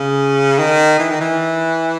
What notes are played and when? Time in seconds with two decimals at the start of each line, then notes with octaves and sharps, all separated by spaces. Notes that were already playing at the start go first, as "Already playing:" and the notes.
Already playing: C#3
0.59 D#3
0.99 E3
1.10 D#3
1.21 E3